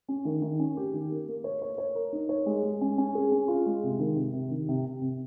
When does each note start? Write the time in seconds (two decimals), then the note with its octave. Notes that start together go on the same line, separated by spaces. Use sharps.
0.08 C#4
0.25 D#3
0.42 D#3
0.59 C#4
0.77 G4
0.94 D#3
1.11 A#3
1.28 A#3
1.44 C#5
1.62 C#5
1.78 C#5
1.95 A#4
2.13 D#4
2.29 C#5
2.46 G#3
2.63 G#3
2.81 C#4
2.98 C#4
3.15 G#4
3.32 C#4
3.48 F4
3.66 G#3
3.83 C3
3.99 D#3
4.16 C3
4.33 C3
4.51 D#3
4.68 C3
4.85 C3
5.01 C3